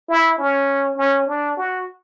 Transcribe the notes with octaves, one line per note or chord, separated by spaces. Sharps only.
E4
C#4
C#4
D4
F#4